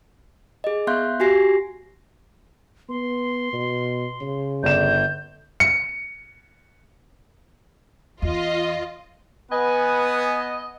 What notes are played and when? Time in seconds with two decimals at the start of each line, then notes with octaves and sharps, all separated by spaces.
0.64 G#4 D#5
0.87 B3 E5 F5 C6 F#6 G6
1.20 F#4 G4 G#5 A#6 C7
2.89 B3 C6
3.53 B2
4.21 C#3
4.63 G1 D5 G6 E7
5.60 C#7
8.22 E2 F4 D#5
9.51 B3 B4 D#5 F#5 G#5